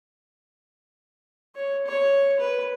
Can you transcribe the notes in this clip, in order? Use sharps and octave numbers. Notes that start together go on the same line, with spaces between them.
C#5
C#5
B4